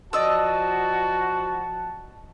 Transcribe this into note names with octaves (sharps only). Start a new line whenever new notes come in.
F3 F#4 D5 D#5 A5 E6